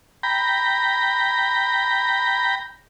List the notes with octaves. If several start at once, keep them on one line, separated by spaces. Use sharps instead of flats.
G5 A#5 B5